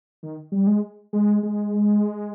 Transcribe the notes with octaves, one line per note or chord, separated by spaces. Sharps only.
D#3
G3
G#3
G#3
G#3